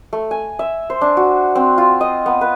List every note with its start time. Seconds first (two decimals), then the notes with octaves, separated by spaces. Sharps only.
0.13 A3
0.31 G#5
0.59 E5
0.90 C5
1.01 D4
1.17 F#4
1.56 C4
1.78 F4
2.01 D#5
2.26 B3
2.41 B4